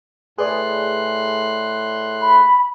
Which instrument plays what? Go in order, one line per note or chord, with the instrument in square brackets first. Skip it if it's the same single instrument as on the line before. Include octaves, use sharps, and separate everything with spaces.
[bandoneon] A2 C6 F#6 [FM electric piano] G#4 B4 D5
[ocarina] B5